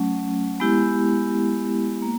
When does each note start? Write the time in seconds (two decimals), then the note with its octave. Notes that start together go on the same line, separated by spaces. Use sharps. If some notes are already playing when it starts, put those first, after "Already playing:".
Already playing: F#3 A3 C#4
0.60 G#3 B3 E4 G4
2.02 A#3